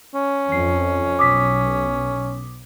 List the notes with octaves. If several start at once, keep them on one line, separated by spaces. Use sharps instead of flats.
C#4
F2 C7
B1 D6 D#6 B6